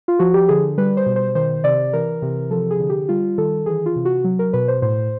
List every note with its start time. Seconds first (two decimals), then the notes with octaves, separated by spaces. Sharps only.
0.08 F4
0.19 F3 F#4
0.34 G4
0.49 D3 G#4
0.78 G3 B4
0.97 C5
1.06 B2
1.16 C5
1.35 D#3 C5
1.64 C3 D5
1.93 E3 A#4
2.22 C3
2.51 F3 A4
2.70 G#4
2.80 D3
2.90 G4
3.09 G3 F4
3.38 D#3 A4
3.66 E3 G#4
3.86 F4
3.96 C3
4.05 F#4
4.24 F#3
4.39 A#4
4.53 B2 B4
4.68 C5
4.82 A2 C5